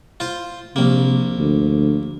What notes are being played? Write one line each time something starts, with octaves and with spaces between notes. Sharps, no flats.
F4 C5
A#1 C3 A#3
D2